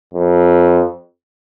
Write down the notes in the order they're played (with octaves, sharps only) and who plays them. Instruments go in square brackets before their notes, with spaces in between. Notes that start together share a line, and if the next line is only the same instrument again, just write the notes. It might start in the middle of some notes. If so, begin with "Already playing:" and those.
[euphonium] F2